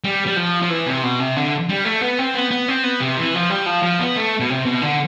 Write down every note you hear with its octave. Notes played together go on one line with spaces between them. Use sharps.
G3
G3
F3
F3
E3
C3
B2
C3
D3
G3
A3
B3
C4
B3
B3
C4
B3
C3
E3
F3
G3
F3
F3
B3
A3
B2
C3
B2
D3